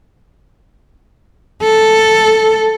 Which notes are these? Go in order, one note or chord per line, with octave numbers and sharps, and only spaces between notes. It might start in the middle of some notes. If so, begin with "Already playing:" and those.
A4